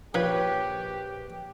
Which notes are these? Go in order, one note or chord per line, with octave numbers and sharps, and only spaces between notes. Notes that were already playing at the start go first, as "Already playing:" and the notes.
A#1 F3 G4 B4 C#5